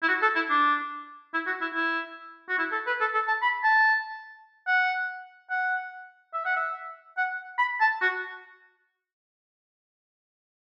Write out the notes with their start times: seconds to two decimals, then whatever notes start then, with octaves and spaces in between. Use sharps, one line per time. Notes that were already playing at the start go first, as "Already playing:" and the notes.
0.03 E4
0.08 F#4
0.22 A4
0.36 E4
0.50 D4
1.34 E4
1.47 F#4
1.61 E4
1.75 E4
2.49 F#4
2.59 E4
2.72 A4
2.87 B4
3.01 A4
3.15 A4
3.27 A5
3.42 B5
3.63 A5
4.67 F#5
5.50 F#5
6.34 E5
6.45 F#5
6.56 E5
7.17 F#5
7.59 B5
7.80 A5
8.01 F#4